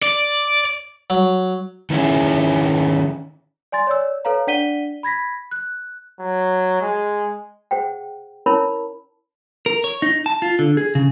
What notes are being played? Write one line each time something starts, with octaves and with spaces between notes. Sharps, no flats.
D5
F#3
D#3 E3 C#4 E4 G#4
D5 G#5 C6 A6
C#5 D5 E6
A4 B4 C#5 F5 A#5
D4 D5 F#5 B6 D#7 G7
B5 G#6 A#6 B6
F#6
F#3
G#3
G#4 C5 F#5 G5
C#4 E4 A#4 C#5 A5 B5
A#4
C#5
D#4
A5
F4
D3
G#4
C#3